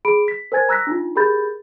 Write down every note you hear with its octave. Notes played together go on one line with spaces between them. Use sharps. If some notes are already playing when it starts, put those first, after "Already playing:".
G#4 B5 D7
B6
A#4 C5 G#5 G#6 A6
A#5 E6 F#6 A#6 B6
D4 D#4 F4
G4 G#4 A#4 B5 G6 A6